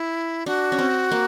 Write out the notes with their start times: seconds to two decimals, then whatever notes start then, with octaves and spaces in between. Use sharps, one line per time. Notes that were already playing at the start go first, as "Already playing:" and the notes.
Already playing: E4
0.46 D4 F#4
0.72 C#4
0.79 C4
1.12 A#3